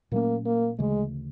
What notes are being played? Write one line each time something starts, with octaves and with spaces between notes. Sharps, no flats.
A#2 F#3 A3 A#3 C#4
A#3
D2 C#3 E3 G#3 A3